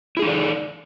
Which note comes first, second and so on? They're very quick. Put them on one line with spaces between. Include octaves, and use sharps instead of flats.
E4 G#4 D#4 A4 D5